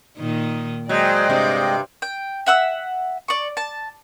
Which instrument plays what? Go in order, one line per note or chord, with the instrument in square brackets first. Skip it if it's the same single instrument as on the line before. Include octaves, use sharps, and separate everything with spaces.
[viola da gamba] A#2 D#3 D#4
[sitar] F#3 [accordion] G#3 D#5 G5 [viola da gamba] C5 D5
[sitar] G2 C3
[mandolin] G5
E5 F#5 E6
D5 C#6
A5